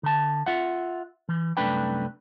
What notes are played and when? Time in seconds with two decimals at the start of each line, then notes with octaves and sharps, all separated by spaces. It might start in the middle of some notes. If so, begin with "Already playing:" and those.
0.03 D3 A5
0.46 F4 E5 F#5
1.29 E3
1.57 C2 F#2 A3 D4 B4 G5